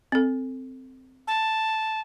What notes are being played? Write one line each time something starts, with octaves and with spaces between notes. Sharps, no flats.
C4 A4
A5